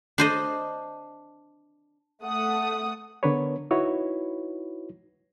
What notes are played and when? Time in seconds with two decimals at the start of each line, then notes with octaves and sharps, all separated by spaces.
0.18 D4 C5 D#5
2.23 A3 F#5 D#6
3.23 D3 B3 D4 A#4 B4 C#5
3.71 D#4 E4 F#4 B4 C#5